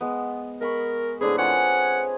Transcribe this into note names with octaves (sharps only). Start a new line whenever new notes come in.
G#3 B3
G#3 A#4 B5 C#6
A2 D3 C4 G#4 B4
F4 G#4 C#5 F#5